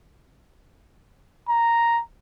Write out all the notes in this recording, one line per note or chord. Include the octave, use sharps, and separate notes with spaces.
A#5